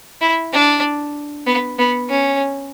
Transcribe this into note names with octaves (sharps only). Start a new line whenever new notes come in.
E4
D4
B3
B3
C#4